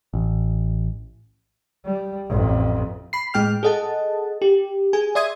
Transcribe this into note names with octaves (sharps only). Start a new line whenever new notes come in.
A1
G3
A1 F2
B5 C7
A2 G#3 G5 F6
G#4 A4 D#5 F#5 A5
G4
G#4 G#5
D5 E5 C6 D#6 G#6